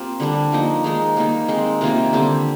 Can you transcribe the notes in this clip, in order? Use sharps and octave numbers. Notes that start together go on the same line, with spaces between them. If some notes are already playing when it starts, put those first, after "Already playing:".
Already playing: A#3 C4 F4 G4
D3 G3 D4
F3 A#3 D#4
D#3 G#3 D#4
D#3 G3 A#3
G#3 C4 D#4
C3 D#3 A#3 F4
D3 G3 C4 G4